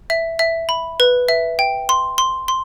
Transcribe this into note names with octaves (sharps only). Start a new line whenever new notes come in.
E5
E5
B5
B4
E5
G5
C6
C6
C6